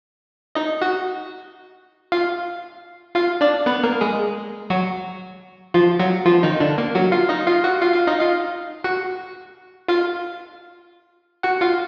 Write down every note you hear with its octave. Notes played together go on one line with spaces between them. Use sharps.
D#4 D#5
F#4 F#5
F4 F5
F4 F5
D4 D5
B3 B4
A#3 A#4
G#3 G#4
F#3 F#4
F3 F4
F#3 F#4
F3 F4
D#3 D#4
D3 D4
A#3
F#3 F#4
F4 F5
D#4 D#5
F4 F5
F#4 F#5
F4 F5
F4 F5
D#4 D#5
F4 F5
F#4 F#5
F4 F5
F#4 F#5
F4 F5